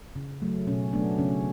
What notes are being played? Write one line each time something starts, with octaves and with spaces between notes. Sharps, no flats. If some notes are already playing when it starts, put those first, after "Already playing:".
C#3
F#3 A3
B2 C#4
F#3 A3 B3 D4
C#3 C#4